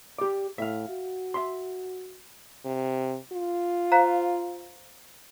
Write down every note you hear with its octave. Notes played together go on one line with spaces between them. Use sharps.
G4 D5
A2 E5 F5
F#4
E5 C6
C3
F4
C5 F5 A#5